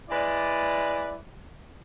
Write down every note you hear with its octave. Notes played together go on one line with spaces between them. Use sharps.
G#3 E4 B4 D5